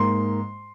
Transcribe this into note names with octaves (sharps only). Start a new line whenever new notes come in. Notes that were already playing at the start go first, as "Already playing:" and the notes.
Already playing: G#2 A#3 C6